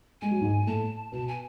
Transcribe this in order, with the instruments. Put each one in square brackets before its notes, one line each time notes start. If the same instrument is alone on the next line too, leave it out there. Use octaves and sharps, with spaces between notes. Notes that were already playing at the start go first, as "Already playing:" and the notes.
[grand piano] G#3 [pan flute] G#5
[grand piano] F#3
G#2 G#3
[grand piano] A2 A3 [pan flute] A5
[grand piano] B2 B3 [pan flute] A5
[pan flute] G#5